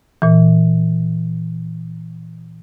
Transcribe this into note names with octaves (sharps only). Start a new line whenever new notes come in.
A#2 E3